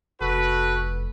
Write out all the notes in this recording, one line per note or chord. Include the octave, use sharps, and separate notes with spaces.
F1 F#4 A4 B4